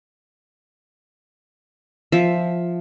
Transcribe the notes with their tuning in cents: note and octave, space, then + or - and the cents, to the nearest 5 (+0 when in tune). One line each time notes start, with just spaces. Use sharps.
F3 +0 E5 +0